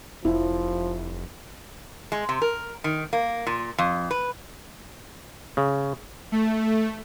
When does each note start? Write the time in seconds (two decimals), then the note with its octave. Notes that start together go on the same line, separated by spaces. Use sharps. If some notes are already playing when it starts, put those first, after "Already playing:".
0.25 F1 F3 E4
2.12 G#3
2.29 C3
2.42 A#4
2.84 D#3
3.13 A#3
3.47 A#2
3.78 F2
4.11 B4
5.57 C#3
6.32 A3